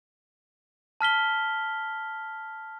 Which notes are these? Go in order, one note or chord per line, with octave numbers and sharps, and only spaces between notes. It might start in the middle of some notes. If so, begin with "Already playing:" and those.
A5 F6 B6 G7